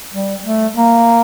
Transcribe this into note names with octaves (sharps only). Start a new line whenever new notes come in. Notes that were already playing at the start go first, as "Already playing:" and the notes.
G3
A3
A#3